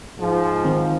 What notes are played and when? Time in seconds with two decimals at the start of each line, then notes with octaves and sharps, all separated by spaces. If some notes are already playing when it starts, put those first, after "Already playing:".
0.19 G#2 F3
0.65 D#3 C4